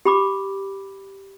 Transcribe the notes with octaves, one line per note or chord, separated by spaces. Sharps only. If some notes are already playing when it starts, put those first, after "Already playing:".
G4 B5 D6